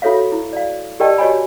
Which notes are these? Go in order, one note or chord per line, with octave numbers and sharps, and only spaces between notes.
F4 F#4 A4 C#5 E5 F5
E4
D5 F5
G4 A#4 D5 D#5 G5 A5
F#4 G4 C#5 D#5 G#5 B5